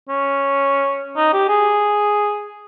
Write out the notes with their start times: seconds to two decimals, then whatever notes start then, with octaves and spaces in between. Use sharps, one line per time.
0.09 C#4
1.17 D#4
1.33 G4
1.49 G#4